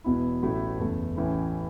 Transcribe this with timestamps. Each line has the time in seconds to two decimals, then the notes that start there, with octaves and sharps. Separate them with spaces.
0.04 E1 E2 B2 B3 E4
0.43 A1 A2 F#3 A3 E4
0.79 F#1 E2 E3 A3
1.17 A1 A2 E3 C#4 E4